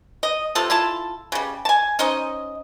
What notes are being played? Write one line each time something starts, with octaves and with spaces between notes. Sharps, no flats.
D#5
C3 A3 F4 A4
E4 F4 A4 A5
C#3 G3
G#5 A5
C#4 D#4 C5 D#5